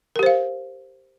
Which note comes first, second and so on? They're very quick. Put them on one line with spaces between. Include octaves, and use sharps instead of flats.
A#4 G4 C5 F5